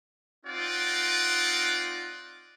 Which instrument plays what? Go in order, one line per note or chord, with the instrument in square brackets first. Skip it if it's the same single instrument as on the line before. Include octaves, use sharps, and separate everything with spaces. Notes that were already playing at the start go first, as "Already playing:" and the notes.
[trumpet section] C4 D#4 F4 D5 F#5